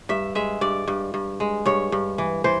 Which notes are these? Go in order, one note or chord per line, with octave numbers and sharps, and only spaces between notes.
G2 E5
G#3 E5
G2 D5
G2
G2
G#3
G2 C#5
G2
E3
E3 C5